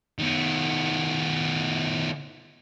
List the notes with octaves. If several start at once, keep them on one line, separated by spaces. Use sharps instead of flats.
D#3 B3